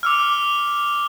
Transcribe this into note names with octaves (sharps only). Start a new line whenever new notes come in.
D6 E6 F6